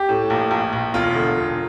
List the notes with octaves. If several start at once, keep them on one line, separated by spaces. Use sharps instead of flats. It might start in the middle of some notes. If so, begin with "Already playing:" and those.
Already playing: G4
A2
A#1
A#1
A#1
E1 F4
D3
E1